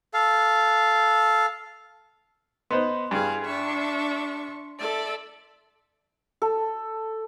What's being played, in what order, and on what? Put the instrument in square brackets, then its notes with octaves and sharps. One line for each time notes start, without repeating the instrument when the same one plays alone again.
[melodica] A4 F5
[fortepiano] B3 D#4 C5 [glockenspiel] C6
[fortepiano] G2 [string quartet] E4 G#4 F5
[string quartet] D4 E5 C#6
A4 D5 E5
[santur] A4